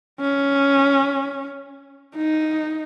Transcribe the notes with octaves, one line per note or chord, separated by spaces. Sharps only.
C#4
D#4